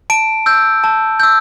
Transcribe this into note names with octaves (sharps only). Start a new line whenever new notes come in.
A5 D7
E6 G6
A5
E6 G6